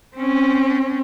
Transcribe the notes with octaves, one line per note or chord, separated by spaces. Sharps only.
C4 C#4